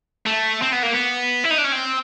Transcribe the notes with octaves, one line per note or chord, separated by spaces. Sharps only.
A3
C4
B3
A#3
B3
E4
D#4
D4
C#4
C4